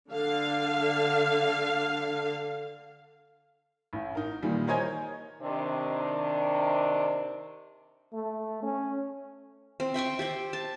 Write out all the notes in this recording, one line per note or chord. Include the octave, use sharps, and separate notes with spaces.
D3 F5
A1
D#4 A#4
A#2 D#3 E3 G3
A#4 C5 C#5 D#5 G#5 G#6
C3 D#3 D4
A3
C#4
C4
E5 G5 C6 C#6
G4 C5 G5
A5